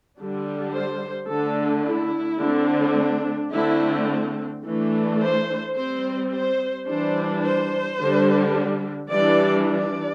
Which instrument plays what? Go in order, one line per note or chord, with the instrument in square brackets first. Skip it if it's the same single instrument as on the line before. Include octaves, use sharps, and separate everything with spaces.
[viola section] D3 G3 D4
C5
D3 A3 D4 A4
E4
D3 A3 C4
D4
D3 A3 C4 E4
E3 A3 D4
C5
G3 C4 C5
C5
E3 G3 D4 C5
C5
D3 G3 D4
E3 G3 D4 D5
D5